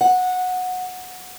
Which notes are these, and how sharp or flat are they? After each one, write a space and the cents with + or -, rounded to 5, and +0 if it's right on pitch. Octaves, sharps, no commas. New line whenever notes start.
F#5 -15